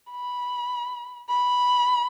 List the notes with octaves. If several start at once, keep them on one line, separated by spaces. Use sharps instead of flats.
B5
B5